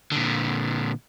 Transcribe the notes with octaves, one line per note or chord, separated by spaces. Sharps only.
A#2 D3